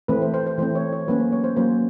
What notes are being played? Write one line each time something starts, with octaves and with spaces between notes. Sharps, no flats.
E3 A3 C4 B4
C5
C5
C5
E3 A3 C4 C5
C#5
C#5
C5
F#3 A#3 C#4 B4
C5
C#5
C5
F#3 A#3 C#4 C5